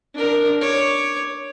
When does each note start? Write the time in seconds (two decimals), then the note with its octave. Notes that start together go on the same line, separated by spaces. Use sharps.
0.14 D4 A#4
0.61 C#5 D6